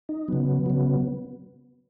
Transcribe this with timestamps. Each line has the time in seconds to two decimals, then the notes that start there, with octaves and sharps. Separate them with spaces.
0.09 D#4
0.28 C#3 F#3 B3
0.66 C#3 F#3